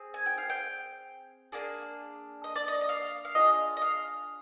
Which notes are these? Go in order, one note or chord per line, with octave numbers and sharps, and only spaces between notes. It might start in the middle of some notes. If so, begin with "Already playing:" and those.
Already playing: C4 G#4
G#5
G5
F5
G5
A#3 D4 G#4
D#5
D5
D#5
D#5
F5
F5
D4 F4 G#4 D#5
D#5
F5